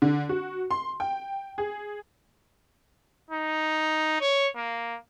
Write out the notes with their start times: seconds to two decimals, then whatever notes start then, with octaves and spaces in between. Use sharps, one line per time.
0.02 D3
0.29 F#4
0.71 C6
1.00 G5
1.58 G#4
3.31 D#4
4.20 C#5
4.55 A#3